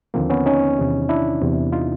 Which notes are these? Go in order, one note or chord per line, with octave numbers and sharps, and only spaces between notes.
D#2 D3 F3 A#3 C4
B3 C#4
C#4 D#4
E2 C3 D#3
D4 E4
E2 C3 E3
D#4 F4